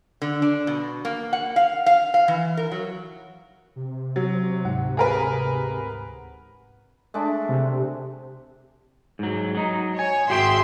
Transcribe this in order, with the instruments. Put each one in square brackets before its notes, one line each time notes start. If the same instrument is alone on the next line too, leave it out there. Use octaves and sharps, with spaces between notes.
[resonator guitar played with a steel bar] D3
D4
B2
A#3
F#5
F5
F5
F5
E3
A#4
F#3
[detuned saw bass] C3
[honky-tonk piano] F#3
[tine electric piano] D2 G#2 F#5
[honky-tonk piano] G#4 A#4 B4
[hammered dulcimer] G#3 D4 [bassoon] A3
[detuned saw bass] C3
[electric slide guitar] G#2 F#3
F#3 D#4
[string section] C#5 [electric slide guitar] G#5
[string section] G#1 E5 C6 [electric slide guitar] F#4 G#4 G5